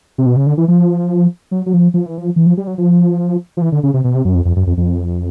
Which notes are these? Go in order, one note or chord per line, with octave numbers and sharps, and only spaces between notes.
C3
B2
C#3
D3
E3
F3
F#3
F#3
F3
F3
E3
F3
E3
F3
G3
F#3
F3
F3
E3
D3
C#3
C3
B2
C3
F#2
F2
F2
F#2
F2
F2